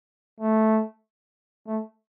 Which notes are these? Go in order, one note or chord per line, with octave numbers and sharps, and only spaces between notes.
A3
A3